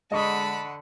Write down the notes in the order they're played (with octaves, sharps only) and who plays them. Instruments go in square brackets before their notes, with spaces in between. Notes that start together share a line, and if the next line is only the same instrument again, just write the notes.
[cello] D3 F#5 [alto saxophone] G#3 [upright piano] D#5 C#6 D#6 [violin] A5 B5